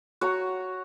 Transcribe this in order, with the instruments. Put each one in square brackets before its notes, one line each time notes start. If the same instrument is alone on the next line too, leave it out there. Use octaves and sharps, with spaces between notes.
[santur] F#4 C#5 A#5